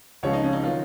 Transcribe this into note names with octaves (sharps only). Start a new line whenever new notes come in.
C#2 C#3 F3 C#5
D#4
C#4
D#4
D#3 F#3 F4